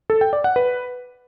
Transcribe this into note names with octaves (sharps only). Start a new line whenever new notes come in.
A4
G5
D5
F#5
B4